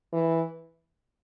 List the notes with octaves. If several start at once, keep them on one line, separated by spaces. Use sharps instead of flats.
E3